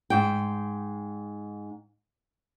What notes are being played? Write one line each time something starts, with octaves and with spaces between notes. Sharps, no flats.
G#2 G5